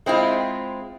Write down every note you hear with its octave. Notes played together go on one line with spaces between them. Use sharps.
G#3 C4 E4 F4